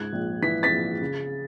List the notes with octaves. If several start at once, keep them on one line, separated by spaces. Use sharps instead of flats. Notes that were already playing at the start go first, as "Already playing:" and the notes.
Already playing: C#2 G#2 F#6 G#6
A#1
E3 B6
A6 B6
A#1
C#3